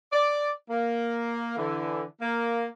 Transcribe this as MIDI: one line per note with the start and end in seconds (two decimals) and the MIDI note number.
0.13 0.48 74
0.70 1.56 58
1.57 2.03 50
1.57 2.03 52
2.21 2.65 58